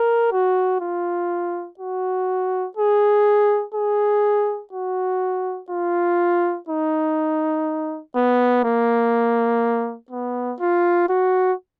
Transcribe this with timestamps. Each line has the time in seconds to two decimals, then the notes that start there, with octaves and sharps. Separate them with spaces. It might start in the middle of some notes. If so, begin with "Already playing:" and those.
Already playing: A#4
0.32 F#4
0.81 F4
1.79 F#4
2.77 G#4
3.74 G#4
4.73 F#4
5.70 F4
6.69 D#4
8.16 B3
8.64 A#3
10.11 B3
10.60 F4
11.09 F#4